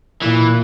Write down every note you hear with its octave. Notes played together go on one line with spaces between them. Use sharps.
A#2 E3